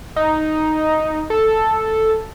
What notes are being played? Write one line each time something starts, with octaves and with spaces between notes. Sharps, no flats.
D#4
A4